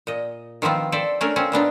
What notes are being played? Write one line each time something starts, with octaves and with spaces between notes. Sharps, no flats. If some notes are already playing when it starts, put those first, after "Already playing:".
A#2 D#5
D#3 F3 B3 C4 F4
A4 C5 D5 E5
A3 C#4 D4 A#4
C4 C#4 F4
A#2 B3 D4 D#4